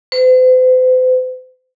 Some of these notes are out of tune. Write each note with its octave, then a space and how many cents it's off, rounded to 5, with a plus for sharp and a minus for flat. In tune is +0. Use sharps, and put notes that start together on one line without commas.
C5 -45